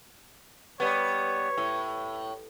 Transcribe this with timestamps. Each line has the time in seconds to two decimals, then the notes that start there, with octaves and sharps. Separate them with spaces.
0.80 G3 B3 C#5
1.58 A2